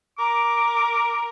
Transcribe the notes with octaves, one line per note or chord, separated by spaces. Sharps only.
A#4 D6